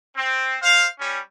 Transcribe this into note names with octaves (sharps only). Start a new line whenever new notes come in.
C4
C5 F5
G3 C#4